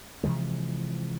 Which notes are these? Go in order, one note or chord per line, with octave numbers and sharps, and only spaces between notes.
C3 E3 F3 G#3